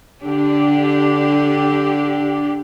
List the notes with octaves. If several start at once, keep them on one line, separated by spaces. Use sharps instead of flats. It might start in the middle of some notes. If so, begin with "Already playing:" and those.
D3 D4 G4